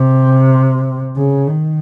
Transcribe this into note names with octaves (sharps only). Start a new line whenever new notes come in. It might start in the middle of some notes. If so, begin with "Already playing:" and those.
Already playing: C3
C#3
D#3